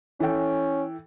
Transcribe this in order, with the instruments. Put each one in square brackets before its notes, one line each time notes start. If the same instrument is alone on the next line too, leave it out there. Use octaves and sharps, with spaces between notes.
[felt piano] E3 A4 G5 [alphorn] C#4